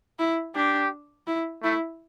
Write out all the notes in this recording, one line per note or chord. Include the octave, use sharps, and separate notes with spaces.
E4
D4 G4
E4
A3 E4